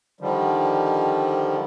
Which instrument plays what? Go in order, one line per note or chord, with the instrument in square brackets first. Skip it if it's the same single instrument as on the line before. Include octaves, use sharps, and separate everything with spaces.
[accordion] D3 D#3 F3 G3